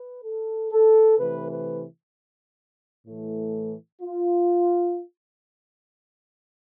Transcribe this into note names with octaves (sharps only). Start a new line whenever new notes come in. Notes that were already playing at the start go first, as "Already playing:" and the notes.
Already playing: B4
A4
A4
C3 E3 A3 B4
B4
A2 E3 A3
F4